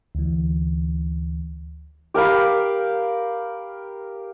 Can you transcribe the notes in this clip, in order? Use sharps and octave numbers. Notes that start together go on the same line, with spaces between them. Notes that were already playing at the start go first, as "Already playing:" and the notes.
D2 E3
G4 A#4 F5 B5